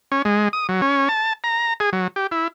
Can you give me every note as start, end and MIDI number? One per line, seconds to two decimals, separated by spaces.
0.12 0.22 61
0.25 0.49 56
0.53 0.67 87
0.69 0.81 54
0.82 1.09 61
1.09 1.33 81
1.44 1.74 82
1.80 1.90 68
1.93 2.08 54
2.16 2.27 67
2.31 2.48 64